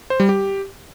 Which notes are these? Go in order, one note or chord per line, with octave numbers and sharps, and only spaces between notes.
C5
G3
G4